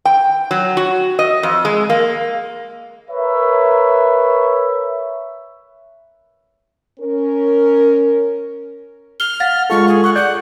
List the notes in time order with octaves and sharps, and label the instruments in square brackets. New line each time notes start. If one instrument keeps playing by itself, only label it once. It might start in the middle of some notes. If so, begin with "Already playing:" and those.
[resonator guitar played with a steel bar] G5
F#3
F#4
D#5
F2
G#3
A#3
[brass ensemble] A#4 B4 C#5 E5
[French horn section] C#4 A#4
[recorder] F6 [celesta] G7
[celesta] F5 F#5 A6
[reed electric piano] G#3 F4 A4 [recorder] C#6
[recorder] G#4
[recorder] F#5 [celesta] C#6
[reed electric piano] D5 G6 [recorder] F#5